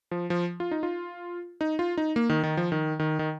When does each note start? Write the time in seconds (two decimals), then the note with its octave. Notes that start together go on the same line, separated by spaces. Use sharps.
0.11 F3
0.30 F3
0.60 F4
0.71 D#4
0.83 F4
1.61 D#4
1.79 F4
1.97 D#4
2.16 A#3
2.30 D#3
2.43 D#3
2.57 F3
2.72 D#3
3.00 D#3
3.19 D#3